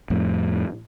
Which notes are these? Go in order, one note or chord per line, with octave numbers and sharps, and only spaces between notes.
F2 A2